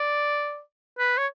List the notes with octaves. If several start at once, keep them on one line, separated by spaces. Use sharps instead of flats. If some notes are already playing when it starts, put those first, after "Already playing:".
Already playing: D5
B4
C#5